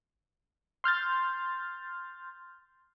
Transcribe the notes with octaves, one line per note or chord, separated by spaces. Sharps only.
C6 F6 G6 A6